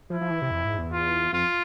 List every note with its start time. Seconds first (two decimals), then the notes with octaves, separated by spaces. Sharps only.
0.10 F3 E4
0.21 F3
0.31 E3
0.42 C3
0.51 F2
0.65 G#2
0.78 E2
0.92 F4
1.33 F2 F4